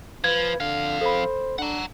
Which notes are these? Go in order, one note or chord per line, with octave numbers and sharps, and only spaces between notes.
F3 B4 G#6
F2 D3 F5
A4 C5 B5
D4 F#5 A#5